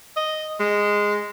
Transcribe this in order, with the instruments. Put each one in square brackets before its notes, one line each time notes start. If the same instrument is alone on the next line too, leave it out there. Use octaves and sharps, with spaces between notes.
[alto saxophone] D#5
G#3